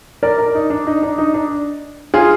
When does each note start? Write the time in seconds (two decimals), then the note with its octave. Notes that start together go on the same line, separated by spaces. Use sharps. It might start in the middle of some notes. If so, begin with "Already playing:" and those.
0.23 A#4 D5
0.38 A#4 D5
0.55 D#4
0.70 D4
0.87 D#4
1.03 D4
1.18 D#4
1.34 D4
2.14 F4 G#4